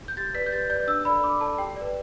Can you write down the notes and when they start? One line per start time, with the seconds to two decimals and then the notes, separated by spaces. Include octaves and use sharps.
0.08 G6
0.17 G4 A6
0.34 B4 D5 B6
0.46 G6
0.52 G4 A6
0.70 B4 D5 G6
0.87 D4 E6
1.05 A4 D5 B5
1.23 D4 D6
1.41 A4 D5 A5
1.58 G4 G5
1.76 B4 D5